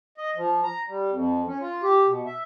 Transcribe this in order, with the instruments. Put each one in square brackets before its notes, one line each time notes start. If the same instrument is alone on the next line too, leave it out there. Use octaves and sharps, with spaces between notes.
[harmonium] D#5
F3
A#5
G3
F2
C#4
F4
G4
B2
E5